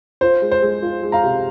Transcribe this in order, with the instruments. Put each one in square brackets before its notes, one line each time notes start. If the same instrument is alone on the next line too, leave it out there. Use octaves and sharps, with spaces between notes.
[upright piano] F4 [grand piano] C5
[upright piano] G#3
[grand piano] C5
[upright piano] G#3
F4
G#3
[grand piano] F5 A#5
[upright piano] C3